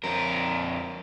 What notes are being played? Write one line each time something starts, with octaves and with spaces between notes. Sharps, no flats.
F2 A#4